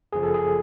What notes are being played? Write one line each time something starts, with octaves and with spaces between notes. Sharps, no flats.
G1 F#2 C#3 F3 G#4
A4
G#4